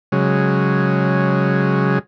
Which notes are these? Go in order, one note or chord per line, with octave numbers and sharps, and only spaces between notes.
C#3 F#3 G#3